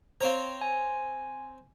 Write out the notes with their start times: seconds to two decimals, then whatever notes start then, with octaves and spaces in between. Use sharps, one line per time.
0.21 C4 C5 C#5 F5 A#5
0.61 G#5